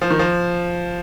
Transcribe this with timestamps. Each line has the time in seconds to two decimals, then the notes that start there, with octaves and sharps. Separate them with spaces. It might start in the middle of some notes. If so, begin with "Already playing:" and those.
0.01 F3
0.11 D#3
0.19 F3